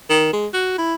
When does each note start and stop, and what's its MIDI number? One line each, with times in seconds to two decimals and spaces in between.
0.10 0.30 51
0.33 0.47 56
0.54 0.73 66
0.78 0.95 64